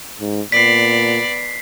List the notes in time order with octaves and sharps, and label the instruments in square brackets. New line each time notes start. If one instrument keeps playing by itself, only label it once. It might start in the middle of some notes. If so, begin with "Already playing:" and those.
[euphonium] G#2
[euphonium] A#2 [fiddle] B3 D5 [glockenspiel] B6 C7